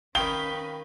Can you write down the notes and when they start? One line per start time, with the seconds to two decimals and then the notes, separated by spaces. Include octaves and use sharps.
0.15 D#3 C#4 D#4 B4 F5 G5 C#6 G7